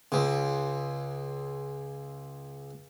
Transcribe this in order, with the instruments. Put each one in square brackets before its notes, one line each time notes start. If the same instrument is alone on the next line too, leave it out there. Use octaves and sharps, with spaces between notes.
[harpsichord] C#2 C#3